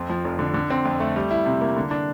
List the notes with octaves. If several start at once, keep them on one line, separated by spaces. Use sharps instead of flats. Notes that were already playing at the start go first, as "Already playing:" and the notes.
Already playing: F2 C4
F3
F1
D3
D3
C4
F2
A3
G3
E4
C3
A#3
D3
D4